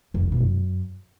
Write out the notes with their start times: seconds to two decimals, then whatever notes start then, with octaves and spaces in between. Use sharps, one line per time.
0.14 F2
0.23 D#3
0.32 B2
0.40 F#2